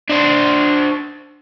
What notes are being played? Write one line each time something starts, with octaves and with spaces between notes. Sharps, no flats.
D4 C5